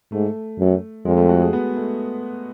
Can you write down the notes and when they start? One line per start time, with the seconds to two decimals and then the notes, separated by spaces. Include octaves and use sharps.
0.12 G#2 A3
0.59 F#2
1.05 F2 G#3
1.17 A3
1.29 F#4
1.42 G#4
1.53 B3
1.76 A3